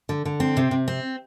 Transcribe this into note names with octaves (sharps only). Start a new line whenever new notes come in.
D3
D3
C4
C3
C3
C4